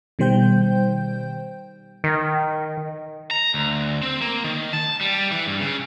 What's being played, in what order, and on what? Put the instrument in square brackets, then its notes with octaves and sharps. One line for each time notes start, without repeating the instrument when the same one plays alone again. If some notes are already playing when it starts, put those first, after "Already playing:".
[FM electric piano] B2 D#3 G3 C5 G5 G6
[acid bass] D#3
[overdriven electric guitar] A#5
D2
C4
A#3
D#3
A5
G3
E3
G2
C#3